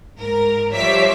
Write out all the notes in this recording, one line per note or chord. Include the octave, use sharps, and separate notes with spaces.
G#2 A#4
F3 G3 C#5 E5 D6 B6